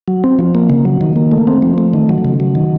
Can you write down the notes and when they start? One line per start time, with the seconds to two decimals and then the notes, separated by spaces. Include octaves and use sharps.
0.08 F#3
0.24 C4
0.39 F3
0.55 A#3
0.70 C#3
0.85 F#3
1.01 D#3
1.16 A#3
1.32 A3
1.47 C4
1.62 F3
1.78 A3
1.94 D#3
2.09 F#3
2.25 C#3
2.40 F#3
2.55 D#3